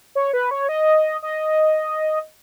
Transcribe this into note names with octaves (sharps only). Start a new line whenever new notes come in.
C#5
B4
C#5
D#5
D#5